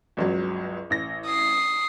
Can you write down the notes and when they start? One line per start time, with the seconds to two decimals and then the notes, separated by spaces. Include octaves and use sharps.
0.17 G1 C#2 F#3
0.90 A1 A#6
1.27 D#6 C7